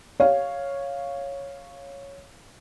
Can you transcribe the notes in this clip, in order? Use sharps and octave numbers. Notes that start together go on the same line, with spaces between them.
C#5 F5